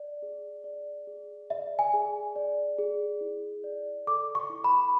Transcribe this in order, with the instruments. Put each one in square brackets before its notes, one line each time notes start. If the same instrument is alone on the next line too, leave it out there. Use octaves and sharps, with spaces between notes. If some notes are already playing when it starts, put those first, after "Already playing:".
Already playing: [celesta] D5
G#4
D5
G#4
D5 E5
G#5
G#4
D5
G#4
E4
D5
A4 D6
C#6
E4
B5